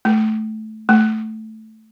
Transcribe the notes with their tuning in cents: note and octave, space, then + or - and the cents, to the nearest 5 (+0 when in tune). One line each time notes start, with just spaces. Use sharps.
A3 -15
A3 -5